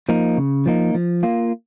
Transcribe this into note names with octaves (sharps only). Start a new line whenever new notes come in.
F3 A#3 D#4
C#3
F3 A#3 D#4
F3
A#3 F4